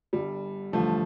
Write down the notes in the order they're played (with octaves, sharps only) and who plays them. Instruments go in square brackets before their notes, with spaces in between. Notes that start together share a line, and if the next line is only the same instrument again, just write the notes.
[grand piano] G1 G2 D3 G3
A1 G2 D3 F3 A3